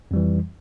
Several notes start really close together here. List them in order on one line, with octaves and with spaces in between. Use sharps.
F2 G3 E3